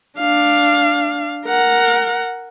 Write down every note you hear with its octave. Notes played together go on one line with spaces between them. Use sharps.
D4 F5
A#4 F#5